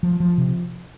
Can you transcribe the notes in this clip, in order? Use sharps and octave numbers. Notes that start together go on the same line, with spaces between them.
F3
F3
C3